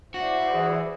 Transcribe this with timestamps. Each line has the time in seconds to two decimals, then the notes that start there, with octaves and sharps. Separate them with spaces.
0.14 E4 F#4 C5 D5
0.53 E3 G#4